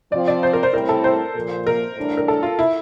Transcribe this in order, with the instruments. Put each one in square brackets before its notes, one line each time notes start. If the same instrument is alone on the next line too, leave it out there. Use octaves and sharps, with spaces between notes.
[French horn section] F3 C4 F4 [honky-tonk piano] D5
[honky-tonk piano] D5
C5
A#4
C5
[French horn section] A2 G3 C4 E4 [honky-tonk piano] A#4
[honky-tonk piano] A4
C5
[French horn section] A#2 F3 A#3
[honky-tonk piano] A#4
[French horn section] A2 E3 G3 D4
[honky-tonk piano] A#4
A4
F4
E4